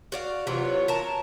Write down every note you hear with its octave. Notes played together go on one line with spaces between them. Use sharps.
F#4 D5 F5
C3 E3 F#3 F4 F#4 C#5
A#4 A5